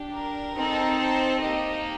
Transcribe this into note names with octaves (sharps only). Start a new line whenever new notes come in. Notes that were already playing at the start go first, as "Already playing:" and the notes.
Already playing: D4 G4
A#4
C4 D#4 A4
C5
A#3 D#4 G4 D#5